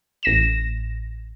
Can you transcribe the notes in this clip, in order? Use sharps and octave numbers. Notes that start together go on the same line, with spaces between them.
A1 A#6 E7